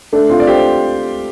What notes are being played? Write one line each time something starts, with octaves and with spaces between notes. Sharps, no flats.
A3 D4
C4 F4
D5
G4 C5